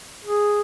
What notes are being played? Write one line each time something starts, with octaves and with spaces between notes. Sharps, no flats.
G#4